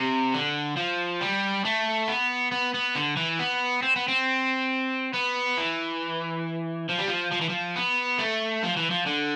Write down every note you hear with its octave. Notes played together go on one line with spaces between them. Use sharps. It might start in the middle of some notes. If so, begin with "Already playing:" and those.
Already playing: C3
D3
F3
G3
A3
B3
B3
B3
D3
E3
B3
C4
B3
C4
B3
E3
F3
G3
F3
F3
E3
F3
B3
A3
F3
E3
F3
D3